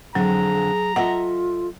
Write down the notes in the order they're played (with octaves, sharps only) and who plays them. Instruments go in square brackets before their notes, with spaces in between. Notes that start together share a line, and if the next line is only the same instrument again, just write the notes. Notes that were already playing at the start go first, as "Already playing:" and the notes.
[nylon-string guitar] F2 D3 [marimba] F#3 [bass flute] G#4 [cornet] A#5
[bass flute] F4 [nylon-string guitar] A4 D#5 E5 [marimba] F#5